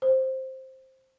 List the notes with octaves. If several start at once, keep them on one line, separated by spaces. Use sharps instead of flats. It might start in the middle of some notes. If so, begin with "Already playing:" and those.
C5